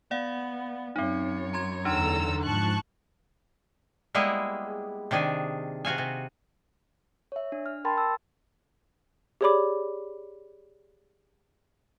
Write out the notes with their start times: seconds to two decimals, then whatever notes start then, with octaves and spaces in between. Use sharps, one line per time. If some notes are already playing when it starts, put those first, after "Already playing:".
0.11 B3 D5 F5 F#5
0.96 F#2 C4 D#4 C#5
1.53 A#5 C6 G#6
1.85 E2 D3 D4 D#4 A4 A#5 C6 E6
2.43 G#2 F3 A5 C#6 F#6
4.14 G3 G#3 A#3 B3 E4 G#4
5.11 C3 D#3 D4 G#4
5.85 C3 F#4 F5 G#5
5.98 C3
7.32 C#5 E5
7.52 D4
7.66 F6
7.85 A#4 G5 A5 B5 C6 A6
7.97 A5 E6 A6
9.41 G4 G#4 C#5 D5 B5 D6